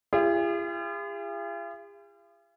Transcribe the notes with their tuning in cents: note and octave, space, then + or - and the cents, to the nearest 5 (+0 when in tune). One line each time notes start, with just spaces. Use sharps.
F4 -45 G#4 -45